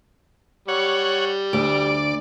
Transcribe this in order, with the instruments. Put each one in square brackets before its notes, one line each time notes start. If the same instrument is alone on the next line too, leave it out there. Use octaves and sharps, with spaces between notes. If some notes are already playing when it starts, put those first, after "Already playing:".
[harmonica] G3 [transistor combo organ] C#5 F#5
[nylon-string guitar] D2 [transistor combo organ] D5